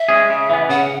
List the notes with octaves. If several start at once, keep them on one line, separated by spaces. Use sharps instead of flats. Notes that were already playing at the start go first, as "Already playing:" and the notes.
Already playing: E5
G#3 C#4 G#4
C#3
E3 B3
C#3 F#5